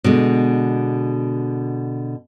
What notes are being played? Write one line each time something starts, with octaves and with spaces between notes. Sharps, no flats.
B2 D3 G#3